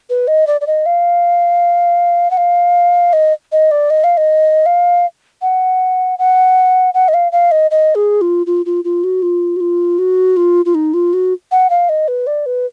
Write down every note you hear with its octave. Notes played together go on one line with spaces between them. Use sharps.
B4
D#5
D5
D5
D#5
F5
F#5
F5
D#5
D#5
D5
D#5
F5
D#5
F5
F#5
F#5
F#5
D#5
F5
F5
D#5
D#5
G#4
F4
F4
F4
F4
F#4
F4
F#4
F4
F#4
F4
F4
D#4
F4
F#4
F#5
F5
D#5
B4
D5
B4